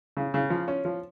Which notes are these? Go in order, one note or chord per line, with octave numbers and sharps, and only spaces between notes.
C#3
C#3
F3
C#4
F3